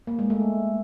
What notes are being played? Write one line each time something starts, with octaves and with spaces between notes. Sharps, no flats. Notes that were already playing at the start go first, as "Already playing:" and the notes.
A#3
G#3
A3